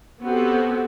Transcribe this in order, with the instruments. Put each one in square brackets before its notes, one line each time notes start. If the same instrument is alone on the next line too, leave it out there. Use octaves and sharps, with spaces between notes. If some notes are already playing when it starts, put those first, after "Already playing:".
[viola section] B3 C4 F#4 G4 A4